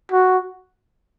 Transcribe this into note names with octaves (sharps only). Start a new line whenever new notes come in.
F#4